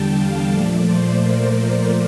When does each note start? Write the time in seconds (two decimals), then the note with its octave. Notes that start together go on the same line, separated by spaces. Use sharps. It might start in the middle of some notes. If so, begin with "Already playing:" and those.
Already playing: E2 D3 G3 G5 A5
0.16 F5
0.50 A#2 F3 A3 D5
0.85 C5
1.20 A#4